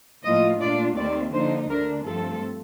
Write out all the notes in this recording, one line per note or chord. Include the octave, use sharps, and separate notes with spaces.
A2 F3 A#3 F4 D#5
A#2 A3 D4 F4 D5
D#2 D#3 A3 C4 D5
D3 F3 A#3 D#4 C5
D2 D3 A3 D4 A#4
G2 F3 A3 C4 A4